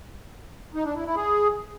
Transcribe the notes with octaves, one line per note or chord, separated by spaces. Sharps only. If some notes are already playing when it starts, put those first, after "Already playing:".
D#4
D4
E4
E4
G#4